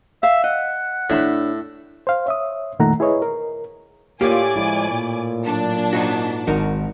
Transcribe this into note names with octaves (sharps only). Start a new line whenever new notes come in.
E5 F5
D#5 F#5
A2 D4 C#5 E5 B5
C5 F5
C#5 E5 D#6
F2 A#2 D#3 A3 F#5 A#5
E4 G#4 B4 C#5 D#5
A#4
A2 A#3 F4 G4 D5 G#5 D6
F3 G#3 E4
A#2
F#3 D4
G#2 D#4 F#4
G#1 D#4 F#4 A#4